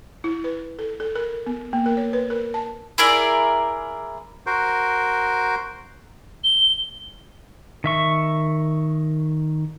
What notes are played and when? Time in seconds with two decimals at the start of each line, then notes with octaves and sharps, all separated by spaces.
0.24 E4
0.44 B4
0.79 A4
1.00 A4
1.15 A#4
1.46 B3
1.73 A#3
1.86 A#4
1.97 C#5
2.13 B4
2.30 A#4
2.54 A5
2.98 E4 G#4 A#4 D5
4.46 F#4 A#4 C5
6.44 G7
7.84 D#3 E5 C#6